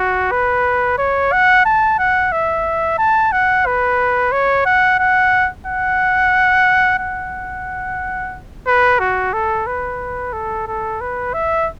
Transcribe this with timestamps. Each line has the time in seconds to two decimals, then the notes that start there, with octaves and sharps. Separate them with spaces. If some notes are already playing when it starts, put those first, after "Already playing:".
Already playing: F#4
0.31 B4
0.98 C#5
1.32 F#5
1.65 A5
1.99 F#5
2.32 E5
2.98 A5
3.32 F#5
3.66 B4
4.32 C#5
4.66 F#5
4.99 F#5
5.67 F#5
6.99 F#5
8.67 B4
8.99 F#4
9.33 A4
9.67 B4
10.33 A4
10.67 A4
11.01 B4
11.33 E5